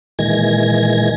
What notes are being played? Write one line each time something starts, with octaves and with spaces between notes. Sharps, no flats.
A#2 D#3 E3 G#3 G#6 A#6